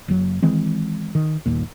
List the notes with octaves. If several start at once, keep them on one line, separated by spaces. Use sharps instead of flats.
F#1 F#3
D#3 E3 G#3 C4
D#3
G1 D#2 A#2